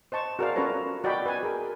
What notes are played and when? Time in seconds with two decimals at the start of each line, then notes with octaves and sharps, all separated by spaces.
0.12 C5 D#5 A5 C#6
0.39 F#4 G#4 A#4 C5 D5 F5
0.56 C#4 F4 A4 B4 C#5 A#5
1.04 F#4 D5 D#5 G5 B5
1.26 B4 G#5
1.43 G#4 A#4